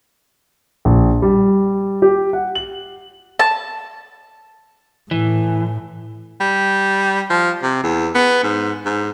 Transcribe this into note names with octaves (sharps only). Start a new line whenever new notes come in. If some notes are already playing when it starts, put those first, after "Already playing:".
A#1
G3
G4
F#5
F#7
A5
A2 E3
G3
F3
C3
E2
B3
G#2
G#2